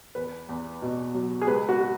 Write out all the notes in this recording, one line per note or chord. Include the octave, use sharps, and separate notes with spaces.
E2 B4
E2
B2
F#3
G#4
C#2 B4
F#4
F#4